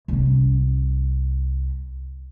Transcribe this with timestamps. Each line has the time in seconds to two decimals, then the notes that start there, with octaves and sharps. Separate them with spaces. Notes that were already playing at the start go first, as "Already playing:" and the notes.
0.08 C2 C#4